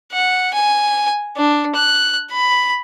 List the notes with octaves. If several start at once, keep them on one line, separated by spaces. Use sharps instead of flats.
F#5
G#5
D4
F#6
B5